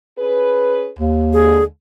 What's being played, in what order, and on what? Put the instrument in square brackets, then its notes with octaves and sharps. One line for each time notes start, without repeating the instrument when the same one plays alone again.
[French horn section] C#4 G#4 B4
[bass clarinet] D#2
[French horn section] D3 G#3 [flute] G#4